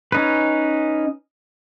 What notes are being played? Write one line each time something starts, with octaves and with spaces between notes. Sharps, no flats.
C#4 D#4 B4